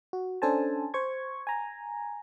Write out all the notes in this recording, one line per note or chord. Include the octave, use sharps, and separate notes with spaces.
F#4
C#4 D4 A4 C5 G#5 A5
C5 C#6 G#6
G#5 A#5